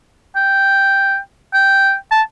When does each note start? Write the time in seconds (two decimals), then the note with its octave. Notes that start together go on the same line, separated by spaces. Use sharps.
0.36 G5
1.53 G5
2.11 A5